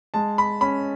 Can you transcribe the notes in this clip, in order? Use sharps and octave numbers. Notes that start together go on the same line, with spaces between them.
G#3 A5
B5
C#4 B5